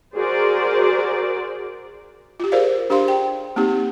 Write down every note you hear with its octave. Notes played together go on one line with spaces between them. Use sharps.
F#4 G#4 A#4 C5 D5
F4 G4
G#4 A#4 C5 D5 F5
D4 G4 C5 F5 C6
G5
A#3 C4 D#4 G4